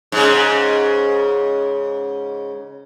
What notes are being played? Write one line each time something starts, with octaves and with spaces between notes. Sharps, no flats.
G#2 C#3